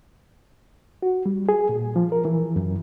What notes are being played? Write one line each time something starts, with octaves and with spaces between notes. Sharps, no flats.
F#4
G3
G#4
A#2
F3
A#4
E3
F#2